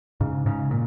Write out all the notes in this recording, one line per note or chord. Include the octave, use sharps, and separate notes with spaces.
G#2 C#3
G#2 C#3
A#2